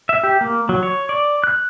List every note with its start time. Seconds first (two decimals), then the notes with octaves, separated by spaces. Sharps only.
0.09 E5
0.23 G4
0.41 A#3
0.69 F#3
0.83 C#5
1.09 D5
1.44 F#6